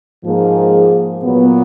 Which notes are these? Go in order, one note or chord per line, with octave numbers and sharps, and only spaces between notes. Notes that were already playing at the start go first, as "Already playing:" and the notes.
G#2 F3 A#3 F4 G#4
A#2 F#3 B3